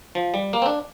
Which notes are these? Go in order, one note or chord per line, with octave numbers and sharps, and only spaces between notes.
F3
G3
A#3
C4
D4